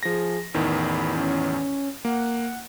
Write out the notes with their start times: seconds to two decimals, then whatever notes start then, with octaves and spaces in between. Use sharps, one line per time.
0.03 F3 G#4 A#6
0.54 A1 E2 D#3 B5
1.14 C#4
2.05 A#3 F#5